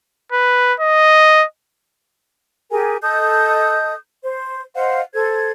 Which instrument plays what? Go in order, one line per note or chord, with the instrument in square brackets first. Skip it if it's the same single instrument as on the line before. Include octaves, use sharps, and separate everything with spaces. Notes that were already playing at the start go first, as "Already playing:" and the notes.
[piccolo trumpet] B4
D#5
[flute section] G4 G#4 A#4 G#5
A4 D#5 D#6 G6
C5
C5 D#5 F5 F#5
A4 C5 G#6